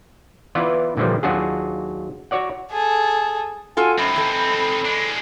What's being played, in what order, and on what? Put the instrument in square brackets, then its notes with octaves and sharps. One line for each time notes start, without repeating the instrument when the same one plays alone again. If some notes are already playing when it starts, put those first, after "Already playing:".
[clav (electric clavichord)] E3 B3 E4 F4 B4 D5
A#2 D3 E3 F3 G3
D#2 F#3 D4 F4 F#4 G#4
F#4 C#5 D5 F#5
[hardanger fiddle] G#4 [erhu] A4
[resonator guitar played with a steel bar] F4 F#4 A4 [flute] G#5
[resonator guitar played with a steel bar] F#2 [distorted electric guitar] C4 D#4 [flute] B5
[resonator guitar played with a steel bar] E3 A4
[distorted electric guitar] G#3 D4